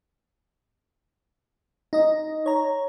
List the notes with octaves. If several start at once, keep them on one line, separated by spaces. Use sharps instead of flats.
D#4 D#5
C#5 A#5